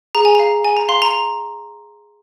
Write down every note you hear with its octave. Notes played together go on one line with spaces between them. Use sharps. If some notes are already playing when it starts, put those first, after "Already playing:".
G#4 A#5
G#5
A#5
F5
G#4 G#5
A#5
F5 C6
A#5